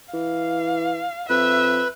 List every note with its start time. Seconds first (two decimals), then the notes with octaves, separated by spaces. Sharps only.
0.14 E3 F5
1.29 F2 B4 E5